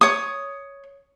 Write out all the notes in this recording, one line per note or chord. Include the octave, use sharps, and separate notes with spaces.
C#5 D#6